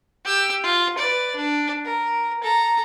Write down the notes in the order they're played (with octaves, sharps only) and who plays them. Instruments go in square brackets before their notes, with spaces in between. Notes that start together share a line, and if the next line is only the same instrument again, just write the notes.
[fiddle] G4 E6
F4
B4 D5
D4
A#4
A4 A#5